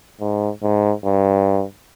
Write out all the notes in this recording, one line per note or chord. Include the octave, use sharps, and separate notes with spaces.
G#2
G#2
G2